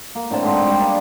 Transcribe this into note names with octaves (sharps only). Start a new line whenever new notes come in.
A#3
A2 D3 C4 A5
G#2 C4
G3 G5 C#6
A#3 D4 D#5 F5